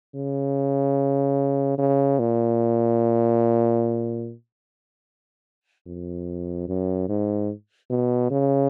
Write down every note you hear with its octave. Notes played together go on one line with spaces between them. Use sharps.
C#3
C#3
A#2
F2
F#2
G#2
B2
C#3